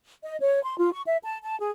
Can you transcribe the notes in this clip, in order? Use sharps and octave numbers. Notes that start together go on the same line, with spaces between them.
D#5
C#5
C6
F4
C#6
E5
A5
A5
G#4